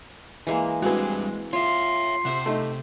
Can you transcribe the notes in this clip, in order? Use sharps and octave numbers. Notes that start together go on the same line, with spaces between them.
E3 G#3 A#3
E3 G3 G#3 C4 D4 F#4 G#4
F4 C#5 E5 C6
C3 C5 E5 F#5
A3 D#4